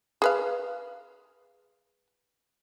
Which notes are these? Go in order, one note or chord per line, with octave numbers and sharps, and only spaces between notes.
G#4 B4 F5